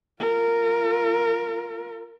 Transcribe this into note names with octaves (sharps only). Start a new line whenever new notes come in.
F4 A#4